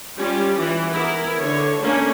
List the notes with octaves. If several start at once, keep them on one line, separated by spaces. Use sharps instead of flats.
G3 C#4 F4 G4
E3
B3 E4 A#4
D3 C#5
A3 A#3 C#4 D4